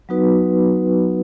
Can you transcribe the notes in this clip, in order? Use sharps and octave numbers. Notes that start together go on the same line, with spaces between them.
F#3 B3 D#4 F#4 B4